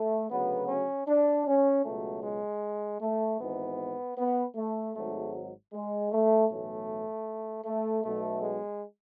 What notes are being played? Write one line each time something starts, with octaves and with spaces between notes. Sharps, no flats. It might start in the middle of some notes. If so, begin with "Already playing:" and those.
Already playing: A3
D2 C#3 F#3 B3
C#4
D4
C#4
C#2 B2 F#3 A3
G#3
A3
G#1 G#2 E3 B3
B3
A3
G#1 G#2 F#3 A3
G#3
A3
B1 A2 E3 A3
A3
B1 B2 F#3 A3
G#3